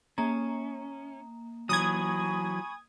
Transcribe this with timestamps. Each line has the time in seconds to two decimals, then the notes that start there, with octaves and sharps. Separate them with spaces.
0.18 A#3 C#4 A#5
1.69 E3 F#3 G#5 B5 C#6 D#6 G#6